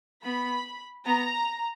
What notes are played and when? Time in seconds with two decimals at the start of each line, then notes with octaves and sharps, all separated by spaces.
0.24 B3 B5
1.05 B3 A#5